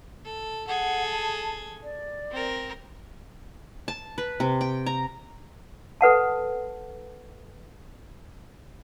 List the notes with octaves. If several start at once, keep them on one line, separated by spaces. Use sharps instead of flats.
A4
G#4 A4 F#5
A5
D5
C4 A#4
A5
B4
C3
G5
A#5
A4 B4 F#5 A5